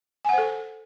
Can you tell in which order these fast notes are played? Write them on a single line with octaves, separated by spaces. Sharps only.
G#5 F#5 C5 A4